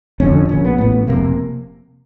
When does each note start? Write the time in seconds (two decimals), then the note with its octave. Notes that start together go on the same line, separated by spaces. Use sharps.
0.20 F1 F2 D3 C#4
0.49 A#1 A#2 C#4
0.65 B3
0.78 A1 A2 B3
1.07 F1 F2 C3 A#3